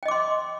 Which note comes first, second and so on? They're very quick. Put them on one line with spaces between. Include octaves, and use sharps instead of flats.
G5 D#5 D6 C6